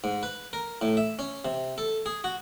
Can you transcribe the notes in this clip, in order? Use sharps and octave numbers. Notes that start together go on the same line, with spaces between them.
G#2
B4
A#4
A2
E5
C#4
C3
A4
G#4
F#4